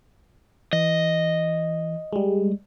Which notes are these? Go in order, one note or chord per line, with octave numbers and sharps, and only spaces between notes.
E3 D#5
G3 G#3